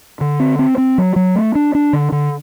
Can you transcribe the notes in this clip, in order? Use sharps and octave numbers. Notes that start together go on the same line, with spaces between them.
D3
C4
C4
C4
F#3
F#3
A3
D4
D4
D3
D3